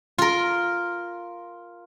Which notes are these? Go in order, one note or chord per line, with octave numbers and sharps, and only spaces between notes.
F4 A#4